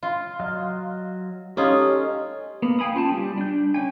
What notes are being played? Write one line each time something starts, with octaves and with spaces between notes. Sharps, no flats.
F4
F#3 D#5 F6
C#4 D#4 F4 G4 A4 D#6
A#3 B3
F5 G5 G#5 B5 D#6
C#4 F4 G5 A5
G3
D4 G6
C#4 G5 G#5